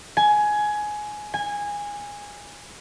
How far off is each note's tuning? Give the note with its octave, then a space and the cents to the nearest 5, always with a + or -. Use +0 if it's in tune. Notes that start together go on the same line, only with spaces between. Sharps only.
G#5 +15
G#5 -15